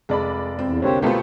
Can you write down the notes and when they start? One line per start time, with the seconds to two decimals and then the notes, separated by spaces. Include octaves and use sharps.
0.09 F1 G#3 D5 B5
0.59 E2 C4
0.82 C2 D3 A#3 G4 C5 C#5
1.02 B2 A3 A#3 F4 G4 B4 C5